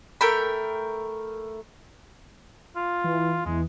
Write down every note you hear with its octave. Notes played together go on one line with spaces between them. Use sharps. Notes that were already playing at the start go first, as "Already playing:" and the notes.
A3 A#4 G5 B5
F4
E3
E2 E3 G#3